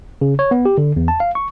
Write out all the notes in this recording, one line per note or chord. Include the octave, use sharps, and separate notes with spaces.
C#3
C#5
B3
G4
D3
E2
A5
F5
C#6